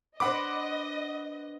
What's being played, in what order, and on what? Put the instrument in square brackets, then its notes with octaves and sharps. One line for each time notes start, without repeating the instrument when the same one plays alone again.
[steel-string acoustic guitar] B3 D4 C5 [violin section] D#5 [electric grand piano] F#5 B5 D6